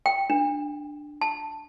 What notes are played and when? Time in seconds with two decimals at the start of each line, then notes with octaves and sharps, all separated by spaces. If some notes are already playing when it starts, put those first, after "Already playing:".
0.06 G5
0.30 D4
1.21 A5